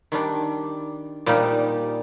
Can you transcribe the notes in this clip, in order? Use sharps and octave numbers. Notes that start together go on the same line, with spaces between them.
D#3 G3 D4
A#2 G3 A#3 D#4 G4